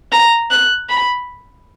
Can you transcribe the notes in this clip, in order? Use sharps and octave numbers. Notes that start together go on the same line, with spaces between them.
A#5
F#6
B5